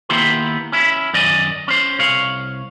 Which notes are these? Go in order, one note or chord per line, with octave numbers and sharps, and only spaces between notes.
D#3 A#3 B3 E4 G4 C6
C#4 E4
F#2 D#3 D5 D#5 G#5
C#4 C5
C2 C#5 F5